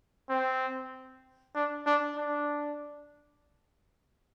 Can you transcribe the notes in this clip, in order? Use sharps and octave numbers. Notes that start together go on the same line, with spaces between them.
C4
D4
D4
D4